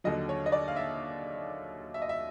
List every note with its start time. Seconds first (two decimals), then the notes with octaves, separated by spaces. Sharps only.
0.04 D#2 D3 F#3 D#5
0.29 C#5
0.46 D#5
0.52 D5
0.68 F5
0.76 E5
1.94 E5
2.02 D#5
2.09 E5